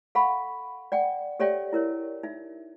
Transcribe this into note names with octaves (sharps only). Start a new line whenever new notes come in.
A4 F5 F#5 B5 C#6
D5 F#5 G5
G4 A4 C#5 D5 E5 G5
E4 A#4 C#5
D#4 E5